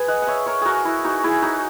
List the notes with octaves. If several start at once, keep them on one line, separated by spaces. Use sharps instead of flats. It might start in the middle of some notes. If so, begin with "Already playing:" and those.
Already playing: G#4 B4 G#5
D#5 F#5
F#5
C#5 E5
A#4 C#5
F#4 G#4 A#4
E4
D#4 F#4
E4 G#4
D#4 F#4